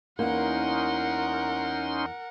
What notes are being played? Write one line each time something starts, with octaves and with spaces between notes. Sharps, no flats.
E2 A#3 C#4 D#4 A#4 F#5 C6